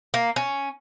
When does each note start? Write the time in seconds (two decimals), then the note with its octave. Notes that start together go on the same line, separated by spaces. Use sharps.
0.14 A#3
0.36 C#4